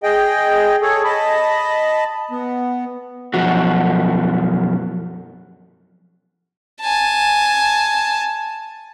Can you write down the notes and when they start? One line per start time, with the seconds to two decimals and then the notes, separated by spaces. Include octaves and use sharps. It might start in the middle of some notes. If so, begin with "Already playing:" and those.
0.03 G#4 D#5 G5
0.82 G#4 A4 C#5
1.05 D#5 A5 B5
2.31 B3
3.34 F#2 B2 F3 F#4
6.81 G#5 A5